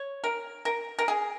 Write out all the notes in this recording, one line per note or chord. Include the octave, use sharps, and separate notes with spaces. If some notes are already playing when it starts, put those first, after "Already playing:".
Already playing: C#5
A#4
A#4
A#4
G#4